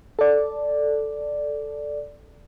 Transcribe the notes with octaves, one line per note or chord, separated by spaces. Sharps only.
A4 D5